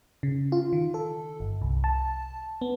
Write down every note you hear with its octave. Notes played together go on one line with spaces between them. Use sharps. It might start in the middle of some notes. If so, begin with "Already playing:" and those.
C#3
F4
D#3
A4
G1
C2
A5
B3